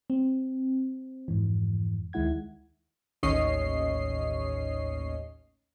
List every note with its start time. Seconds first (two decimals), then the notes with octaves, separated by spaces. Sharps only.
0.10 C4
1.28 F2 G#2 E3
2.13 D2 D#3 G#3 E4 F#5 G#6
3.23 A1 D#2 C#4 C#5 D#5 C7